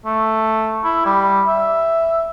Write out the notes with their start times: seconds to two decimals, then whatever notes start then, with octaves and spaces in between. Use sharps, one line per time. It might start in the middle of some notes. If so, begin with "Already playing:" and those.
0.06 A3
0.84 E4
1.05 G3
1.47 E5